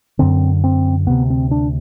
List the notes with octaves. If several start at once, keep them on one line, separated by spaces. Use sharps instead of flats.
F#2 D3 C4
C4
D2 C3 B3
C4
D4